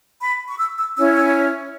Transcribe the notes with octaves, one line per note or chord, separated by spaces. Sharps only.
B5
C#6
E6
E6
C#4 E4 C#5 E6
E6